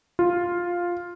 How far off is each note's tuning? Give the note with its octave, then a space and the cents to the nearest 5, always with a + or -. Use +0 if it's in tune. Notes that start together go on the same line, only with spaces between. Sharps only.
F4 +5